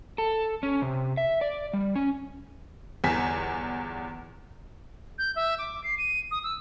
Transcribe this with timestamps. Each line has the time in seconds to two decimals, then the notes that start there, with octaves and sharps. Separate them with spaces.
0.18 A4
0.63 C#4
0.82 C3
1.17 E5
1.41 D5
1.73 G3
1.95 C#4
3.04 G1 E2 G#5 B6
5.18 G6
5.36 E5
5.58 D6
5.84 C7
5.98 D#7
6.31 D#6
6.44 E6